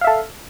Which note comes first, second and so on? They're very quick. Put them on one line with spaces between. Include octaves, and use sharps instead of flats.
F5 E5 A4